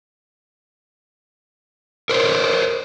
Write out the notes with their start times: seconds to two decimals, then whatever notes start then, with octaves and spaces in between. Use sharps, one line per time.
2.09 A#4 C5 C#5